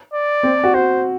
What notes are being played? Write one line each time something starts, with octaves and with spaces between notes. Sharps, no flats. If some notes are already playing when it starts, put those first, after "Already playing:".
D5
C4
F#4
F#4 C5